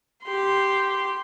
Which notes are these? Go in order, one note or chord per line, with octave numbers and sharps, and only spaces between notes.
G4 C6